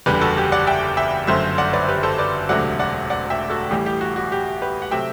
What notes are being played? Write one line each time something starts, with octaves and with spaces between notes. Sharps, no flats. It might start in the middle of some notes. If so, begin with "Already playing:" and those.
F#1 E2 D3 G3 G4 B4
F#4 A4
G4
D5 F#5
E5 G5
E5 G5
G1 F#2 F#3 A3 C5 E5
D5 F#5
B4 D5
G4 B4
A4 C5
B4 D5
E1 D2 C3 F#3 A3 D5 F#5
D5 F#5
D5 F#5
E5 G5
F#4 A4
A1 A2 E3 G3 G4
G4
F#4
F#4
G4
G4 B4
F#5
C3 F#3 A3 E5 G5